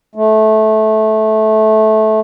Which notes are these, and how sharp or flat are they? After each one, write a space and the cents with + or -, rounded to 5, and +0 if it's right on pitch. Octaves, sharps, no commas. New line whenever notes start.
A3 -20